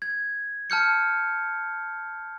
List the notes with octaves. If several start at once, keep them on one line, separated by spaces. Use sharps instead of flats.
G#6
A5 F6 G6 C#7